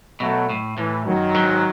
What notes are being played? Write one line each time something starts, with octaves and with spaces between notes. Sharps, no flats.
B2 F#3 A3
A2
A2 E3
F#2 D#3 F#3
G#2